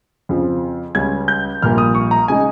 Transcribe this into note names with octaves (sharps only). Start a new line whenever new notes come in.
F2 C#3 F3
C#2 C#3 G3 C#4 G#6
G6
A#1 A#2 G3 A#3 F6
D#6
C#6
A#5
C#3 G#3 D#4 G#5